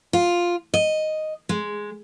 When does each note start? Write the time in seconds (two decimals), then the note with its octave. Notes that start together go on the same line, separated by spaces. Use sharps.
0.13 F4
0.74 D#5
1.49 G#3